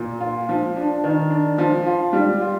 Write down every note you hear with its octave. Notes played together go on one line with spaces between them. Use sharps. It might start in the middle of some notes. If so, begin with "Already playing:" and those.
Already playing: A#2
F4
F3
D4
D#3
D4
F3
F4
G3
F4